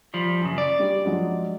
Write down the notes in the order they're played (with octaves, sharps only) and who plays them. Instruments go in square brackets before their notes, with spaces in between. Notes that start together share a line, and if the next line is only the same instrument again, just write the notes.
[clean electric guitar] F3 G3
F#2 C#3
D5
[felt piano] G3
F3 F#3 G#3